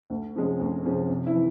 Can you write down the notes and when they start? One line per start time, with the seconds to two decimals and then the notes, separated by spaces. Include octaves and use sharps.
0.10 D2
0.35 C3 F3 G#3 C#4
0.60 D2
0.85 C3 F3 G#3 C#4
1.10 C3
1.26 E4
1.35 E3